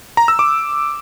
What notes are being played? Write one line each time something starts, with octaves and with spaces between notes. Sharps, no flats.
A#5
E6
D6